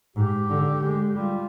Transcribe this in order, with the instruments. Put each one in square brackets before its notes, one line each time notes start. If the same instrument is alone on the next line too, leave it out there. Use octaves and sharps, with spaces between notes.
[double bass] G#2 [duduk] G4
[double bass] D3
G#3
[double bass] G3 [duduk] F4